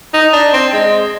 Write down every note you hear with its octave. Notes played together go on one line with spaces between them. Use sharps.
D#4
D4
C4
G#3